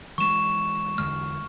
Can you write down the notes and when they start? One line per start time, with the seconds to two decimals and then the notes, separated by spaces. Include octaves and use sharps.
0.18 E3 G#3 C#6 E7
0.98 E2 D3 G#3 F6